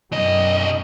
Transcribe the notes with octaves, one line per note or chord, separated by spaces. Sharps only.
B1 F#2 G3 D#5